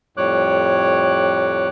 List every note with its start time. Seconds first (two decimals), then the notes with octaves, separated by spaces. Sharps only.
0.17 F2 A2 G3 C#5 D6 F#6